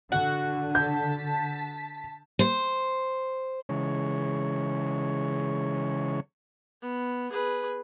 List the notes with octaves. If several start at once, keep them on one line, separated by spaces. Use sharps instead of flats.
D3 F#4
A5 G6 B6
C5
C#3 E3 G#3 C#5
B3
G#4 B4